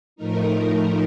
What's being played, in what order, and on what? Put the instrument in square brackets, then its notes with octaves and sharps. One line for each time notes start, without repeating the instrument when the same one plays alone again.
[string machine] A2 F3 A3 D#4 A#4